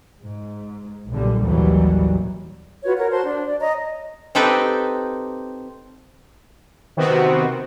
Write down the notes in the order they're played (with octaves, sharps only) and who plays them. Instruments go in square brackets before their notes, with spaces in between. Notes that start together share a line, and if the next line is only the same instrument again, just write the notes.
[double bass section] G#2
B1 A#2 D3 G3
A1 D#2 B2 E3 F#3 G3
[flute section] F4 F#4 B4 C#5
A#4 C#5 F#5
F#4 C5 A5 C6
D4
D5
C#5 D#5 A#5
[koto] C4 D#4 G4 A4 B4 G5
[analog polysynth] C3 D#3 B3 C4 F#4